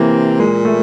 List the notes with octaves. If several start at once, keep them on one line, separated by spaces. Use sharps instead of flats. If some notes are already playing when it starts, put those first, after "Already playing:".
Already playing: C3 E3 A#3
A#2 G#3
A3